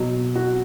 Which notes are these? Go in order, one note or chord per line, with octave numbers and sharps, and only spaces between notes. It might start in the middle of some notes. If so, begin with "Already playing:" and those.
Already playing: B2 F#3
F#4